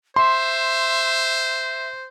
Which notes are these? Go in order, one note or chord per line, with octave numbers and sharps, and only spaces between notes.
C5 E5 C6